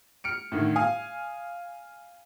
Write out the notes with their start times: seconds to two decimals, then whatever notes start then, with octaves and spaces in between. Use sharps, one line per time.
0.24 F6 C#7 D7
0.52 A2 D3 D#3
0.76 F5 G#5 D#6